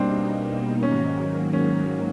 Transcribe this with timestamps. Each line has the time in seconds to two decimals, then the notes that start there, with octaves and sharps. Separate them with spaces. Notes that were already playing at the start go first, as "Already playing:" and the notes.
Already playing: B2 G3 A#3 C4 D4 D#4
0.83 G#2 D#3 F#3 A#3 C#4
1.53 C#4